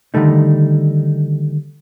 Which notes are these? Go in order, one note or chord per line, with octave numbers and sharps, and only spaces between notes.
D3 D#3 G3 A3 D#4